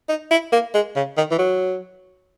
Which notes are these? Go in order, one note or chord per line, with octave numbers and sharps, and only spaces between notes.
D#4
E4
A#3
G#3
C#3
D#3
E3
F#3